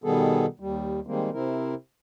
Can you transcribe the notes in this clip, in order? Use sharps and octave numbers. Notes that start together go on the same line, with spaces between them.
B2 D#3 G3 B3 G#4 A4
D#2 G3
D#3 G3 G#3 A#3 C4
C3 C4 E4 A#4